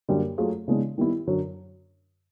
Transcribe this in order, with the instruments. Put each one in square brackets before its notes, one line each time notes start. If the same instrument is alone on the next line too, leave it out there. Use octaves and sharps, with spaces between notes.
[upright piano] F#2 D3 G3 A#3 C#4
F#3 A3 C#4 F4 G#4
C#3 E3 G#3 B3 D4
D#3 G3 B3 E4
F#2 D3 F#3